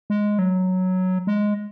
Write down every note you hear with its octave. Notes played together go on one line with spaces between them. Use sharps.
G#3
F#3
G#3